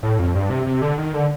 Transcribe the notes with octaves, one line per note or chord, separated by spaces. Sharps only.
A2
F2
G2
C3
C3
D3
D#3
D3